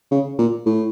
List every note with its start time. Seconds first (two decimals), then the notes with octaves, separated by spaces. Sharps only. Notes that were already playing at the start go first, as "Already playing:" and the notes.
0.11 C#3
0.38 A#2
0.66 A2